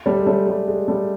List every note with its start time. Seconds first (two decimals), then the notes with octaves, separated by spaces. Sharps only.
0.06 G3 A3
0.19 G#3
0.26 G3 A3
0.47 G3
0.68 G#3
0.88 G3 A3